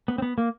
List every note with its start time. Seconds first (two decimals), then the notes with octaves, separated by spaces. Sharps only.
0.08 B3
0.18 C4
0.22 B3
0.38 A#3